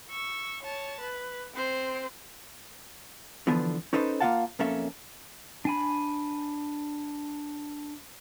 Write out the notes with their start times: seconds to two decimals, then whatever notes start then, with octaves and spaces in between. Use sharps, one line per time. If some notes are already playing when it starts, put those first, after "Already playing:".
0.10 C#6 E6
0.63 C#5 A5
1.00 B4
1.54 C4 C5
3.47 D3 E3 F3 B3
3.93 C#4 D#4 A4 B4 C5
4.20 A#3 C4 F4 F5 F#5 A5
4.59 B1 F2 A#3 C#4 A4 E5
5.65 D4 G#5 B5